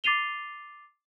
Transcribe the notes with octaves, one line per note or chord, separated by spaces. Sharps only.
D6 A6 C7 D#7 F7 G7